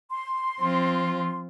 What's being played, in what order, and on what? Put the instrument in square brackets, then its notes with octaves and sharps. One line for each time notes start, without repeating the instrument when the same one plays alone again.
[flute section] C6
[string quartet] F3 C4 F4